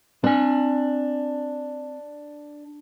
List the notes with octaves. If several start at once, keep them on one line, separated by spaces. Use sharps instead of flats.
C4 D4 G#5